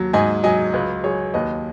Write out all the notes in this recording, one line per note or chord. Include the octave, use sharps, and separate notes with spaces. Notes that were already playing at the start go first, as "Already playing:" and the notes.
Already playing: D#2 F#3
G#2 D#5 G#5
F#3 D#5 G#5
C#2 B4 D#5
F#3 G#4 C#5
D#2 B4 D#5